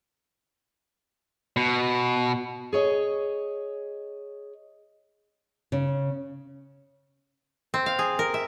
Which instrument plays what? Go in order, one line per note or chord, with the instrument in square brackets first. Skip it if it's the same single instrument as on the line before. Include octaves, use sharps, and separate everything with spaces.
[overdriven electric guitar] B2
[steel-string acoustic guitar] G#4 C#5 D#5
[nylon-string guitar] C#3
[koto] C4
F5
G#4
A#4
E5